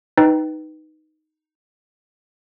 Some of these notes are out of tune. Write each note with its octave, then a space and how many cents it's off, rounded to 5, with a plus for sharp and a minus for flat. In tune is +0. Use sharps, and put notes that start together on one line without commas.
D#4 +0 B4 +0 G5 -10